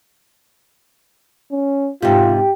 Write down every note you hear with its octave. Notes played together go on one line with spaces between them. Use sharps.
C#4
G#2 C3 F4 G4 G5